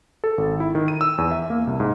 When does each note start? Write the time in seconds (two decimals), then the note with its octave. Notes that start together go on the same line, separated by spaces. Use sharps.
0.24 A4
0.38 G#1
0.60 E4
0.75 D#3
0.88 D#7
1.01 E6
1.18 E2
1.31 E5
1.50 A#3
1.67 C2
1.80 G#2